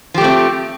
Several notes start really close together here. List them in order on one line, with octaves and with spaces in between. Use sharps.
F3 G4 A3 C4